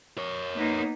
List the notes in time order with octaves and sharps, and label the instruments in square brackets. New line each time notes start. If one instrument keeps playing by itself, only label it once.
[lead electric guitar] A#4 C#5
[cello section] A#3 B3 D#4